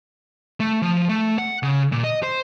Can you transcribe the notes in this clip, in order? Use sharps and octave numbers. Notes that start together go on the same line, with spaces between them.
A3
F3
A3
F#5
C#3
A#2
D#5
C5